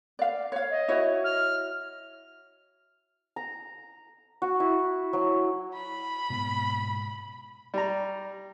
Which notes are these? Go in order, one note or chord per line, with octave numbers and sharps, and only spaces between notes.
D5 F5
C#5 F5
D#5
E4 F#4 C#5
F6
A#5
F#4
E4
F#3
B5
G#2 B2 B3
G3 A#5